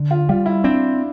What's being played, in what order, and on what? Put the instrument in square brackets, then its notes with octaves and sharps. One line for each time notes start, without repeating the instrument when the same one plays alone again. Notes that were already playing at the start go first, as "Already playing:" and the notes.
Already playing: [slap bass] D3
[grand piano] F4
[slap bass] G3 [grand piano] F4
[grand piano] E4
[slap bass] C4 [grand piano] D4